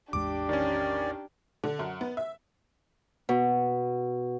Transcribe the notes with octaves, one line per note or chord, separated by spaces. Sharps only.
A1 E2 G#3 D4 G4 D6
D#3 C#4 D5
D3
F#2
B3
E5
B2